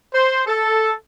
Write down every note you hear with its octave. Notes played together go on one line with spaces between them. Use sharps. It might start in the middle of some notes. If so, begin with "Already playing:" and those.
C5
A4